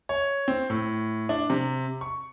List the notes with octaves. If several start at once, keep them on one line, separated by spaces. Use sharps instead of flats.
C#5
C4
A2
D4
C3
C#6